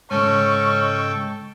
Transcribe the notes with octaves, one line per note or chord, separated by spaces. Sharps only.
G#2 C#3 C#4 A4 D#5 G5 C#6